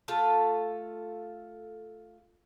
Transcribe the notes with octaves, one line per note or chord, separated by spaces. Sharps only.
A3 F4 A4 F5